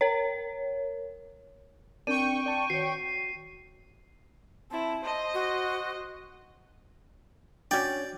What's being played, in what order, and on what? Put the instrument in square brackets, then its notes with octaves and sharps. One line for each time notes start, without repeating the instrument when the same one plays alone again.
[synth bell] A#4 C#5
[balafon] C4 [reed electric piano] D4 A#4 D5 [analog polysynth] G5 C#6 [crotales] D#7
[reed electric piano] D5 A5
[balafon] D#3 C#5 [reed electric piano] F#4 [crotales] C7
[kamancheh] C4 E4 [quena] A5
[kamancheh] C5 D#5
[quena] F#4
[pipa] C#4 G5 [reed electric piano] D4 F#4 C#5 [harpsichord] D5